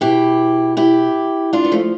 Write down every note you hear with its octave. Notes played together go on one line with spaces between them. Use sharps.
B2 E4 G4
E4 G4
D4 F4
B3
F3 A3